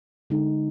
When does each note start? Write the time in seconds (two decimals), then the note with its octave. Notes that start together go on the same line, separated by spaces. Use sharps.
0.30 D3 G#3 D#4